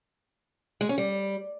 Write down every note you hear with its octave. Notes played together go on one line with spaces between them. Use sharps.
G#3
C#4
G3